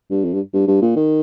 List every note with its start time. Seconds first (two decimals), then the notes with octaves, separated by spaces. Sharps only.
0.10 G2
0.24 F2
0.34 G2
0.54 G2
0.67 G2
0.82 A#2
0.96 D#3